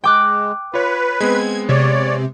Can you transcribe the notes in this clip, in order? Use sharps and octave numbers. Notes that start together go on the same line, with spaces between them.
G#3 G5 D6 F#6
F4 B4 C#5
G#3 B3 C4 G#6
C3 C#5 D5